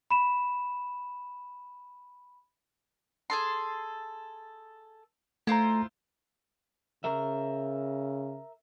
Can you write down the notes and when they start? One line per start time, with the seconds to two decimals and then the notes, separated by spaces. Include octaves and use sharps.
0.11 B5 E7
3.30 G#4 A4 C6
5.47 A3 E4 F4 C5 A#5
7.04 C#3 A#4 E5